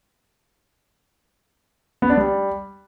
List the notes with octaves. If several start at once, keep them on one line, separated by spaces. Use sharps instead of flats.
B3
D4
G3